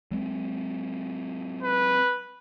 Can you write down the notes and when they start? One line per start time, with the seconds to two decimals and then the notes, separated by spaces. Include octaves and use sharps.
0.11 F#3 G#3 C4
1.63 B4